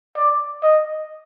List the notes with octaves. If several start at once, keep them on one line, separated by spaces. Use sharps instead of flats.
D5
D#5